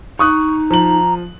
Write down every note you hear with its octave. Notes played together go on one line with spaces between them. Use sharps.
D#4 C#6 D#6 F#6
F3 A#5 F#7